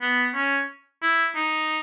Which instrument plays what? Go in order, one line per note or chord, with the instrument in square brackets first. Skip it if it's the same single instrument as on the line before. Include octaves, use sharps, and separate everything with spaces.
[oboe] B3
C#4
E4
D#4